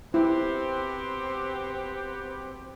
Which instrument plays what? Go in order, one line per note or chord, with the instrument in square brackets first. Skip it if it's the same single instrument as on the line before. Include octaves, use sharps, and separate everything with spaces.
[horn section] B3 F#4 G4 [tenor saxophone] C4 [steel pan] E4